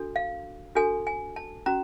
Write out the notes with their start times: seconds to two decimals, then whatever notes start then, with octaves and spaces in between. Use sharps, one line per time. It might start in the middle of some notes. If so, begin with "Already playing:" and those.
Already playing: D4 F#4 A4
0.16 F5
0.75 D4 F#4 A4 G#5
1.07 G#5
1.36 A5
1.66 C#4 F#4 A#5